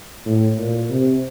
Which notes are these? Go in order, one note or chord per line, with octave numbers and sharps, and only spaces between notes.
A2
A#2
C3